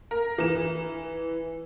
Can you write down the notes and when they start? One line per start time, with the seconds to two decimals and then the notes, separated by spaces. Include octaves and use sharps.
0.11 A#4
0.38 E3 E7